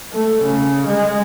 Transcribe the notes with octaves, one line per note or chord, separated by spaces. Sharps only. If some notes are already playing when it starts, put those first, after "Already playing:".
A3
C#3
G#3